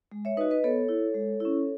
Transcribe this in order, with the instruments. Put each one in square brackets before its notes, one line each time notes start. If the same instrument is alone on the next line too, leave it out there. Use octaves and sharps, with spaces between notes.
[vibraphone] G#3
C#5 E5
D#4 F#4 B4 D#5
B4 D#5
B3 A4 C#5
E4
G#3
C#4 E4